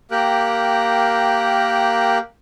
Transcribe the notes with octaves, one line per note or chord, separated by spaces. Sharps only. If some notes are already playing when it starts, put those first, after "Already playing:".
A#3 G4 A#4 G5 F#6